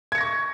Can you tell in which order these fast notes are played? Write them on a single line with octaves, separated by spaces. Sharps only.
G#6 C#7 A#6 C#6